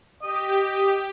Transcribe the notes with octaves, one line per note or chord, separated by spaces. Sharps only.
G4 D#5